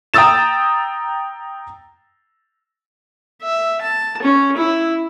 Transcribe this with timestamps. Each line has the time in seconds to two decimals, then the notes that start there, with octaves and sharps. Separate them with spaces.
0.14 G5 A#5 D#6 E6 A6 E7
3.43 E5
3.82 A5
4.22 C#4
4.57 E4